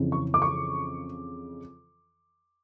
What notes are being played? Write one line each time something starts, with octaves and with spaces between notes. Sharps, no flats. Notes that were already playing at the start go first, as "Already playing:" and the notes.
Already playing: F2 C#3 E3
C#6
D6
C#6